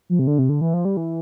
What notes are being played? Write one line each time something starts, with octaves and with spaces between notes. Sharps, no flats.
F3
C3
D3
C3
D3
E3
F3
G3
E3